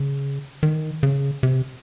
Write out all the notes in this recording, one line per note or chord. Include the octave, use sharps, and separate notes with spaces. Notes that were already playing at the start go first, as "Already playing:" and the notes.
Already playing: C#3
D#3
C#3
C3